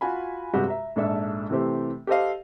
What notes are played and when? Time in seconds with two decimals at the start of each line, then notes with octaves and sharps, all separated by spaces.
0.01 F4 F#4 G#5 B5
0.54 G2 C3 G#3 F#4 G4
0.68 E5 A#5
0.96 A#1 G#2 D4 A4 E5 E6
1.50 C3 E3 A3 C4 G4
2.07 G4 A4 C5 D#5 F5